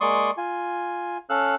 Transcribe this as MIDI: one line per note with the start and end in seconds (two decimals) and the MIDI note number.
0.01 0.31 56
0.01 0.31 58
0.01 0.31 74
0.01 0.31 84
0.01 0.31 85
0.01 0.31 87
0.37 1.18 65
0.37 1.18 80
1.30 1.55 61
1.30 1.55 69
1.30 1.55 77
1.30 1.55 88
1.30 1.55 90